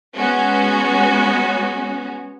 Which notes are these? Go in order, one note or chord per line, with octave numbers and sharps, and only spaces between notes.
G#3 B3 C#4 F#4